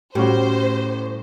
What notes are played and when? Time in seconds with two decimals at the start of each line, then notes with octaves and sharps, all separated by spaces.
0.15 A2 G3 C#4 F#4 C5